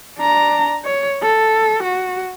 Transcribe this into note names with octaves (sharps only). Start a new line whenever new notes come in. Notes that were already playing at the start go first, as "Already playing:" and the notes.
D4 A#5
C#5
A4
F#4